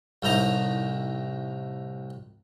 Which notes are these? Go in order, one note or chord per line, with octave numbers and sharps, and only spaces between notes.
C2 A2 D#4 A#5